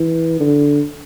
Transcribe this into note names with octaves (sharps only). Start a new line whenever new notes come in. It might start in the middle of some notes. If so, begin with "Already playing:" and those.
Already playing: E3
D3